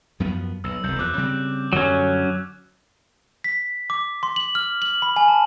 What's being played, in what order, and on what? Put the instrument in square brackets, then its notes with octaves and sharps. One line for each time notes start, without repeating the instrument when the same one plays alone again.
[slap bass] F#2 F3 B3
[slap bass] B1 [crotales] E6
[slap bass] F1 C2 [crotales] G6
[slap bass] E2 F3 [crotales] D6 F#6
[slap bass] C#3 G3 C4
[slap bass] F#2 D3 G3 [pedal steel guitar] F#3 C#4
[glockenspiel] B6
D6
C6
F#7
F6
F#7
B5
G#5
A5